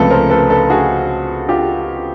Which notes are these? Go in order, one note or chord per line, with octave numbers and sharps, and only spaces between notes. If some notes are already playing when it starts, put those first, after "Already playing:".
Already playing: C#2 C3 F3 A3 A4 B4
A#4 C5
A4 B4
A4 B4
F#4 G#4
F4 G4